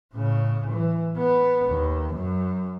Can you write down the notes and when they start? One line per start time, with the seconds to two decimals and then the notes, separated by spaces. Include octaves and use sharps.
0.13 A2 C#3
0.71 E3
1.17 B3
1.67 D#2
2.14 F#2